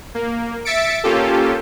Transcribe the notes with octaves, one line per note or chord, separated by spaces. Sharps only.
A#3
E5 A6 B6 C#7 D7
A#3 C#4 F4 G4 A4